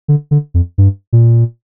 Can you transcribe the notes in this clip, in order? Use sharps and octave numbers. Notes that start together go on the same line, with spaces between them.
D3
D3
F2
G2
A#2